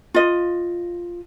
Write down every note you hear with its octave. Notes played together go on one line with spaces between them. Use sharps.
F4 D#5